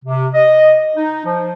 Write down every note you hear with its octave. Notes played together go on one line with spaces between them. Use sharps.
C3
D#5
D#4
F3